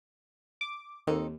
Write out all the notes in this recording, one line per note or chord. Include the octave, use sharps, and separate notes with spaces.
D6
D#2 C4 D#4 A4